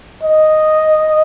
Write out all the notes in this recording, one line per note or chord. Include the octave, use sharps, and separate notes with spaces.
D#5